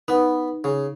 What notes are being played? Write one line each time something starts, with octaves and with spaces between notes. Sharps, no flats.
B3 D#4 B4
C#3